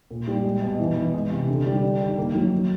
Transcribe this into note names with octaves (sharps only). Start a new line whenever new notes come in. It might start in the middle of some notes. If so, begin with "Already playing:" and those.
A#2
G3
G#3
B2
E3
E3
G#3
C3
D3
G3
D4
D#3
A#3
F#3
A#3